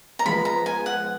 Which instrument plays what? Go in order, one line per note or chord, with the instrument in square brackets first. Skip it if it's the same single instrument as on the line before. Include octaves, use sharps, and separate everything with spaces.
[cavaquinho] A#5
[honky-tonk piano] F3 G#3 B3 F4 [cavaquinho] B5
[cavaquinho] A#5
G#5
F#5